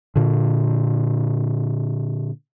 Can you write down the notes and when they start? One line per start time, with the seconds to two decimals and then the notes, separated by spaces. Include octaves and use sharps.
0.16 A#2 D3